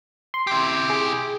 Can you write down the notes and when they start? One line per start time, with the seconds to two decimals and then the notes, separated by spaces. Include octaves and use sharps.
0.34 C6
0.47 E4 G4
0.90 G#4